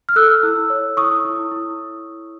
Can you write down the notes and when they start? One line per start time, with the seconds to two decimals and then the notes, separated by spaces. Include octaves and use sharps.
0.09 F6
0.16 A4 E6 F#6
0.43 E4
0.70 C#5
0.97 E4 C#6 D#6
1.25 E4
1.51 E4